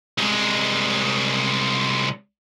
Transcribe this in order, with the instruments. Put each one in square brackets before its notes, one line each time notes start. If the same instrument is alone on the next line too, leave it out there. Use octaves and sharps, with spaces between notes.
[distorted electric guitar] C2 G#3